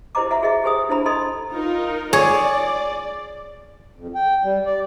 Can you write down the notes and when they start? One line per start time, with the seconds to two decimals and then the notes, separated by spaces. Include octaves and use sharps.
0.15 E4 G4 C5 D#5 A#5 D6
0.30 F#4 E5 F#5 A#5
0.42 F#4 G#4 D#5 E5
0.64 G4 C5 G#5 D#6
0.89 D4 E4 C5 A#5 B5
1.05 D#4 A4 D#5 B5 C6 D#6
1.52 D#4 F4 A#4
2.13 G#4 C#5 D5
3.96 F2
4.15 G5
4.43 G3
4.66 D5